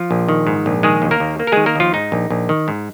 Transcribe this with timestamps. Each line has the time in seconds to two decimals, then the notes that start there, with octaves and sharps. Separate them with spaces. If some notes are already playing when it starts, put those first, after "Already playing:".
Already playing: F3 F4
0.11 A#1
0.29 D#3
0.47 G#2
0.66 A#1
0.83 D#3 G#3 G#4
1.02 D#2
1.11 A#3 A#4
1.20 D#2
1.39 A#3
1.47 A#4
1.52 D#3 G#3 G#4
1.66 A#3 A#4
1.75 D#2 F3 F4
1.94 G#2 D#4
2.12 A#1
2.30 A#1
2.49 D#3
2.68 G#2